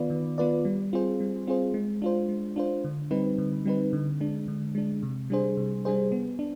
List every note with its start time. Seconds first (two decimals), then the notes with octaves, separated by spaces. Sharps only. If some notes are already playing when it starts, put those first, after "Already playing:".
Already playing: D#3 B3 F4 B4 D5
0.10 D#3
0.38 B3 F4 B4 D5
0.65 G3
0.93 C4 F4 G#4 C5
1.20 G3
1.47 C4 F4 G#4 C5
1.74 G#3
2.02 D4 F4 C5
2.29 G#3
2.56 D4 F4 C5
2.84 D3
3.11 G3 C4 D#4 B4
3.38 D3
3.65 G3 C4 D#4 B4
3.93 D3
4.20 G#3 D4
4.48 D3
4.75 G#3 D4
5.03 C3
5.30 G3 D4 G#4 C5
5.57 C3
5.85 G3 D4 G#4 C5
6.12 B3
6.39 D4